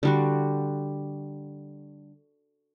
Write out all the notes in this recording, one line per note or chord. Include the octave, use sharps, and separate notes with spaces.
D3 G3 F#4